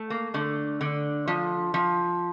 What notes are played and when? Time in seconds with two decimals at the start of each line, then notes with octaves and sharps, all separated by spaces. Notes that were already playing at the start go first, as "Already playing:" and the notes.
Already playing: A3
0.10 A#3
0.34 D3 A3
0.81 D3
1.27 F3
1.74 F3